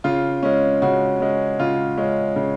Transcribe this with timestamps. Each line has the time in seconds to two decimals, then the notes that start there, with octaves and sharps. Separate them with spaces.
0.04 C#3 F4
0.43 G#3 C#4
0.82 C#3 F#4
1.20 G#3 C#4
1.59 C#3 F4
1.97 G#3 C#4
2.36 C#3